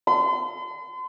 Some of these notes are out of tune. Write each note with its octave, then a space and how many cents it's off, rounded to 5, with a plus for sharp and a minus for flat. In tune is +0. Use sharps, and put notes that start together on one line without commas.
C6 -40